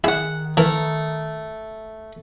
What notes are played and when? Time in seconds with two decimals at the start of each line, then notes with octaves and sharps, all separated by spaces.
0.04 D#3 E4 G#4 F#5
0.57 E3 A3 A#4